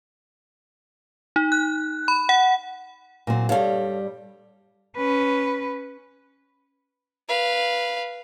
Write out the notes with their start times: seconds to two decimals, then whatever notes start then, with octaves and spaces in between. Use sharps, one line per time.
1.36 D#4
1.52 F#6
2.08 B5
2.29 F#5
3.27 A#2 F#3 C4
3.49 G2 G3 A4 C#5 F5
4.97 C#4 B4
7.28 B4 F5